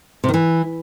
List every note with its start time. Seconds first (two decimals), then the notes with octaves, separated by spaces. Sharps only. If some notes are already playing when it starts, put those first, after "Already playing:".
0.24 C3
0.29 D#3
0.34 E3